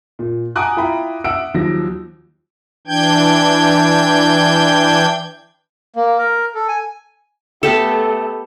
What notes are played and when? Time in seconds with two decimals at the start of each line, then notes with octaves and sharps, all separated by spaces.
0.19 A#2
0.56 F#5 G#5 A#5 D6 D#6 F#6
0.77 E4 F4 G5 A#5 B5
1.24 E5 F#5 E6 D7
1.54 D#2 F3 F#3 A#6
2.87 E3 D4 G5 G6 G#6
5.96 A#3
6.18 A#4
6.55 A4
6.68 G#5
7.63 A3 B3 G4 A4